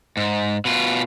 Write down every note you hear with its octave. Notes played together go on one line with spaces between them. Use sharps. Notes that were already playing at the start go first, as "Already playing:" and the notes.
G#2
B2 F4